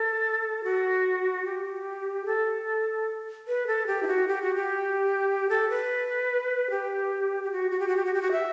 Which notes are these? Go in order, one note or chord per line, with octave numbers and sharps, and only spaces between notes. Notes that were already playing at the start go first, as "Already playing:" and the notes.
Already playing: A4
F#4
G4
A4
B4
A4
G4
E4
F#4
G4
F#4
G4
A4
B4
G4
G4
F#4
F#4
G4
F#4
G4
F#4
G4
F#4
E5